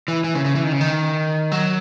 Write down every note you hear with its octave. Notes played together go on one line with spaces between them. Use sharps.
E3
E3
C#3
C#3
E3
D#3
C#3
D#3
F#3